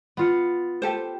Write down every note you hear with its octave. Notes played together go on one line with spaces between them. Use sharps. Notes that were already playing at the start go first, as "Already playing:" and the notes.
B3 F4 C#7
G4 A4 C5